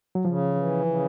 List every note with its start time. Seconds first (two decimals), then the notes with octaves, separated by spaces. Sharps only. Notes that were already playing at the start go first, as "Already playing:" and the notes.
0.15 F#3
0.25 C#3 F3
0.55 E3
0.85 C#3